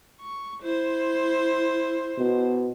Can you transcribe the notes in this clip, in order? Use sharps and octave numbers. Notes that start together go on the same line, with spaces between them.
C#6
E4 C5
B2